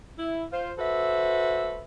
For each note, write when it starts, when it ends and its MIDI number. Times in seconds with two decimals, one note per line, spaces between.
0.18 0.44 64
0.52 0.72 65
0.52 0.72 72
0.78 1.84 66
0.78 1.84 69
0.78 1.84 71
0.78 1.84 72
0.78 1.84 76